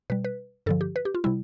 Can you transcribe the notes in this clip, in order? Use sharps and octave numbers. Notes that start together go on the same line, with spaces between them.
B2 G3 B4
B4
G2 D3 F3 A4
G4
B4
G4
F4
C3 G3 E4